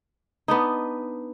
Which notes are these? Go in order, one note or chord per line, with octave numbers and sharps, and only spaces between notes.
B3 D4 D#4